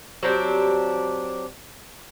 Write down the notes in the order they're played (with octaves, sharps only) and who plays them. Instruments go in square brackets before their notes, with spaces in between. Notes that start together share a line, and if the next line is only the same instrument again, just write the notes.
[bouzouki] F#3 C4 D4 G4